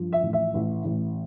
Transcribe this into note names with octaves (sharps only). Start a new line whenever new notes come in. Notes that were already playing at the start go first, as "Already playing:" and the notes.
Already playing: G2 F3
E5
A1
E5
A1
A1